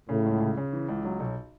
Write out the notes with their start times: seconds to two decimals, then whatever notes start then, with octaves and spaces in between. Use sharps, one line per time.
0.09 A2 C#3
0.26 C#2
0.41 C#3
0.57 C#3
0.73 E3
0.89 C#2
1.05 F#3
1.20 B1